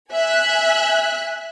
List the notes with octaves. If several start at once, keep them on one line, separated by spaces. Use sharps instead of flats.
E5 G#5 F#6